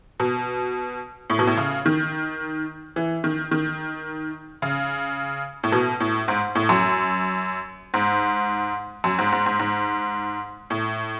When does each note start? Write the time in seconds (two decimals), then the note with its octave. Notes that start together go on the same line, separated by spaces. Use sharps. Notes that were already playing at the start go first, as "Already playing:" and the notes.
0.20 B2
1.30 A2
1.39 B2
1.47 A2
1.57 C#3
1.86 D#3
2.96 E3
3.24 D#3
3.51 D#3
4.62 C#3
5.64 A2
5.72 B2
6.00 A2
6.28 G#2
6.55 A2
6.69 F#2
7.94 G#2
9.04 F#2
9.18 G#2
9.32 G#2
9.46 G#2
9.59 G#2
10.70 A2